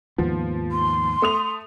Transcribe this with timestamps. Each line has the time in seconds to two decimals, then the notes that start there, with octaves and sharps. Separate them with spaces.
0.18 D#2 G#2 F3 B3
0.71 C6
1.22 A3 D#6 F7